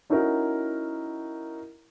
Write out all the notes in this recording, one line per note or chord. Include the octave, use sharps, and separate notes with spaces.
C#4 D#4 E4 F#4 A#4